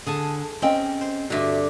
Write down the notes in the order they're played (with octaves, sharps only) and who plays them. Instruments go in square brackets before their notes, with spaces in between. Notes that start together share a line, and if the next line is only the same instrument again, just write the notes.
[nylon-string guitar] D3 [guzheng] G#4 G#5 A5
[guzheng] C4 [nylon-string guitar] C#4 D#5 G5
[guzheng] C5
[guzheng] G2 D3 [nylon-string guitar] F#4 E5